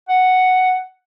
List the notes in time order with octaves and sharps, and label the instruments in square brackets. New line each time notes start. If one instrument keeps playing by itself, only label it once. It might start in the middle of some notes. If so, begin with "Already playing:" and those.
[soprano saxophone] F#5